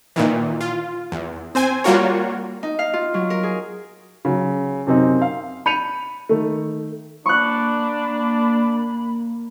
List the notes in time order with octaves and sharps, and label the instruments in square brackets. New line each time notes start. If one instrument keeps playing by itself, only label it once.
[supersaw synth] A#2 D#3 E3
F4
E2
C4 C5 G#5
G3 A#3 F4 F#4 A#4 C#5
[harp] D#4
F5
F4
F#3
A#4
G#4
[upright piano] C#3 F#3
F#2 C3 C4 D#4
F5
B5 G6 C#7 D#7 F7
D#3 A3
[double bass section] A#3 [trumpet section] D4 [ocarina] B5 [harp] C#6 F#6